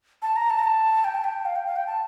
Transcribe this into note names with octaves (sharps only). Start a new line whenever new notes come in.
A5
A#5
A5
A#5
A5
G5
A5
G5
F5
G5
F5
G5
A5